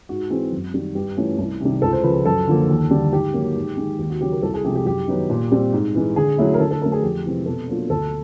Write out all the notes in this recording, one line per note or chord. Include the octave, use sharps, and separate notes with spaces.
G#2 F#4
E3 G#3 C4
F#2
D#3 G3
G2 G4
E3 A3 C#4 F4
C2
C3 D#3 G3
C#2 A4
C5
C#3 F3 B4
F#2 A4
D3 F3 A#3
D#2
D3 G3
G#2 G4
D#3 F#3 A#3
G#2
D#3 G#3
D#2 G4
F#4
C#3 F#3 G4
A#4
C2 A4
G#4
C3 F3 G#3 G4
G4
F#2 G4
D#3 F#3 B3 D#4
A#2
G3 C4
G#2
E3 G#3
D3 G#4
F#3 A3 C#4 E4
A#4
D3 A4
A4
F#3 A3 A#4
G#4
F2 G4
C3 E3 G#3 C4
B2 A4
F#3 A#3 D4 F4
D2 A4